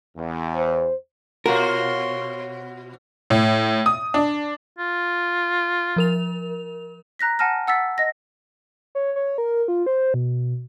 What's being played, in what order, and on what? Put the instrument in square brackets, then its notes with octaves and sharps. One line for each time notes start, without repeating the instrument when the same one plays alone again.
[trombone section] E2
[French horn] C5
[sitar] B2 F4 F#4 [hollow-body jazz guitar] A#4 [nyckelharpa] C#5 C6
[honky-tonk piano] A2
D#6
D4
[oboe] F4
[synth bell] F3 A#4 F7
[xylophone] A#5 F#6 A#6 B6
F#5 G#5 A5 F6 A#6
F#5 E6 A6 B6
D#5 A#6
[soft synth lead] C#5
C#5
A#4
F4
C5
B2